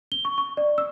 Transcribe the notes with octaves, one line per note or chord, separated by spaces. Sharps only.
G7
C#6
C#6
D5
E6